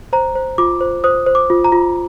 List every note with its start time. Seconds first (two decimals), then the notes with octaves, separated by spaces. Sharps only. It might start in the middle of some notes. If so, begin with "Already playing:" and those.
0.13 C5 A#5
0.35 C5
0.58 F4 D6
0.81 C5
1.04 C5 D#6
1.26 C5
1.35 D6
1.50 F4
1.64 A#5
1.72 F4